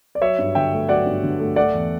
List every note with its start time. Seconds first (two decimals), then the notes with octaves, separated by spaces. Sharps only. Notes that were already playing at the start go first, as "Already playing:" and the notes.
0.15 D5
0.22 F#3 C#5 E5
0.38 G2
0.55 D3 E5 G5
0.72 A3
0.89 F#3 D5 F#5
1.06 G2
1.23 D3
1.39 A3
1.56 A3 D5 F#5
1.73 E2